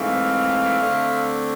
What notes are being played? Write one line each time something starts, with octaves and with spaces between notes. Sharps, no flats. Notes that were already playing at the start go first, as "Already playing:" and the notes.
Already playing: G#2 E3 A3 C4 F5
D3 A3 C4